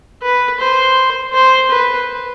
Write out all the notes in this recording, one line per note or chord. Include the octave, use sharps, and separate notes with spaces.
B4
C5
C5
B4